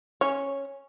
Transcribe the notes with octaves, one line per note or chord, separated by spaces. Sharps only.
C#4 C#5